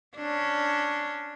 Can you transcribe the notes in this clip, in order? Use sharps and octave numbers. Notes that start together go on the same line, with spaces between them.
C#4 D4